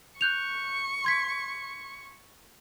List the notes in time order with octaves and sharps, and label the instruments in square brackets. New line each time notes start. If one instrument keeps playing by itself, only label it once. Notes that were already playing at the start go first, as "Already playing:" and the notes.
[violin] C#6 [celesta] F#6 G6 F7
[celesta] C6 G#6 B6